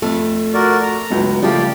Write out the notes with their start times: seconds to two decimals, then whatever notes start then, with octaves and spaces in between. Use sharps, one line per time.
0.02 F2 A3
0.54 F#4 A#4 D5
0.83 A#5
1.10 G1 C#2 F#3
1.43 C#3 F3 G3 A3 A#3 G4 D5